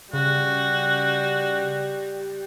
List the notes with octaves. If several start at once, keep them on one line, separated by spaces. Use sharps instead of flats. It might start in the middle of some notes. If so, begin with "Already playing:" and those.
C#3 G3 F#4